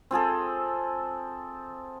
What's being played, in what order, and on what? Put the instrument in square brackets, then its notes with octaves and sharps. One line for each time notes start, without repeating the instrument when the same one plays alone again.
[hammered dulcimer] C4 F4 G#4 A4